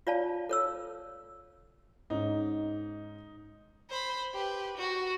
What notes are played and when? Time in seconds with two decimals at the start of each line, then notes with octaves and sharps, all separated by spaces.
0.07 F4 C#5 D5 F5 A5
0.49 A4 C#5 E6
2.10 G#2 C#4 D#4
3.90 C5 B5
4.34 G4 B4
4.77 F#4